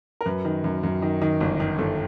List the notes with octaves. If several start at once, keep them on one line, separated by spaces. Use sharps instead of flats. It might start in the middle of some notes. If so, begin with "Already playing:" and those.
A#4
F#2 B4
D#3
F#2
F#2
D#3
D#3
G1
D#3
G1 A4